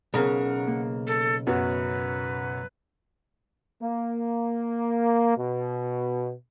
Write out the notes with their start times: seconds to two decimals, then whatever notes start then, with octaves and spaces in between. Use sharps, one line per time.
0.14 B1 C#3 C#4 A#4 F#5 A#5
0.68 A#3
1.07 A4
1.47 F#2 F#3 B3 B4
3.82 A#3
5.38 B2